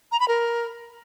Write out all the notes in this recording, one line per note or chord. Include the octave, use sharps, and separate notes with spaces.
A#5
B5
A#4